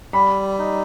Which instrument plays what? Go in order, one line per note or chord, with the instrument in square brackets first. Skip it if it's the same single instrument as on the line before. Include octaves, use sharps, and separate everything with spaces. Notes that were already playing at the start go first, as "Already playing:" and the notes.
[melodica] G3 [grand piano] B5
[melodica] D#4